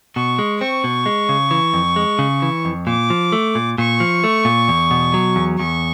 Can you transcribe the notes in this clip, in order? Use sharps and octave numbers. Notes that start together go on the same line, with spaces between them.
B2 C#6
G#3
C4 C#6
B2
G#3
C#3
E3
F2
G#3
C#3
E3
F2
A#2 D6
F3
A3
A#2
A#2 C#6
F3
A3
A#2
E2
B2
F#3
E2
E2 C#6